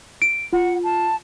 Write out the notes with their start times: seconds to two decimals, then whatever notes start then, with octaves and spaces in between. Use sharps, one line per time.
0.22 D7
0.53 F4 F#5
0.84 A5